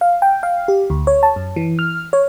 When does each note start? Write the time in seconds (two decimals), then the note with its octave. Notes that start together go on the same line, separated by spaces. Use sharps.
0.01 F5
0.22 G5
0.43 F5
0.68 G4
0.90 D2
1.07 C#5
1.23 A5
1.36 F#2
1.56 E3
1.79 F6
2.13 C#5